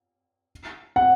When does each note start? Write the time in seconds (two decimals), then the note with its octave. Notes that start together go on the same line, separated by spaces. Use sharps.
0.96 F#5